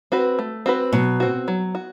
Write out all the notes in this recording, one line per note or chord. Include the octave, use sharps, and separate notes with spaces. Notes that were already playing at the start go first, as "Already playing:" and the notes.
C4 F#4 B4
A3
C4 F#4 B4
B2 F#3
C4 F#4
F#3
F#4